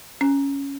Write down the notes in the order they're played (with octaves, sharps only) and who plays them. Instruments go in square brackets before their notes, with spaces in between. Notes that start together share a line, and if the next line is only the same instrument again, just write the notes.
[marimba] C#4